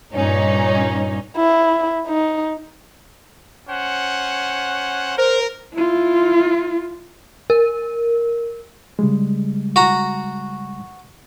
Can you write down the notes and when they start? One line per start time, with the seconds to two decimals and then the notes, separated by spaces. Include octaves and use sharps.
0.12 G2 A#2 C#4 D#4
1.36 E4
2.07 D#4
3.69 C#4 C5 F#5
5.18 A#4 C5
5.74 E4 F4
7.50 A#4
8.99 C#3 G3 G#3
9.76 F#4 A#5